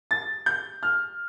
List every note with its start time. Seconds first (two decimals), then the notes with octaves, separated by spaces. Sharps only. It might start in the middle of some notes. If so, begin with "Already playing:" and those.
0.11 A6
0.46 G6
0.83 F6